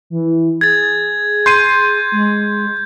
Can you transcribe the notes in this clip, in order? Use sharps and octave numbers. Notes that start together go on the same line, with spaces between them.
E3
G#4 G#6 A6
C6 G6 C7 D#7
G#3